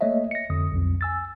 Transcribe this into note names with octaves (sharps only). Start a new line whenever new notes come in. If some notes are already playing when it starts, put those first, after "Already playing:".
A3 A#3 C#5 D#5 E5
A#6 C#7
F2 D3 D#6
B1 F2
G#5 E6 A6